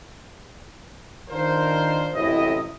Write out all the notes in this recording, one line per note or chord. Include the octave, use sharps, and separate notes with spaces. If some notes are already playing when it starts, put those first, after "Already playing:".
D#3 D4 F4 A#4 C5
A1 F#2 A2 C3 E4 D#5